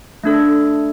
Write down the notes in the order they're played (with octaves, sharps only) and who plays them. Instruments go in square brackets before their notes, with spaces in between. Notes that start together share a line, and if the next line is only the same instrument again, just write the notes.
[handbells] A3 D4 A4